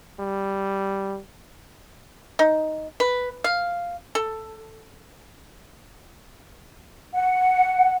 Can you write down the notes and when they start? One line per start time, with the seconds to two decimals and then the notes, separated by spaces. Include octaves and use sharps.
0.20 G3
2.39 D#4
3.00 B4
3.44 F5
4.15 A4
7.12 F#5